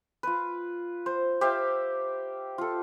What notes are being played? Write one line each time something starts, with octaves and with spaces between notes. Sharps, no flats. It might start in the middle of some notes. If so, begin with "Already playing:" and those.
F4 B4
C5
G4 C5 E5 F5
F4 A4